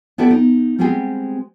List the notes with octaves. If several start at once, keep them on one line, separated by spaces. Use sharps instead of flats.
B3 E4 G4 A4 B4 D5
D#4
G3 G#3 B3 C4 G4 G#4